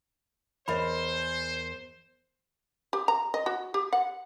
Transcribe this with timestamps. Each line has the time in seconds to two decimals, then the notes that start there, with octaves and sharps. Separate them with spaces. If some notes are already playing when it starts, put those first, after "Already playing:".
0.68 E2 A#4 C5 C#5 D#5 G#5 B5
2.93 G4
3.08 A#5
3.34 D#5
3.46 F#4
3.74 G4
3.93 F#5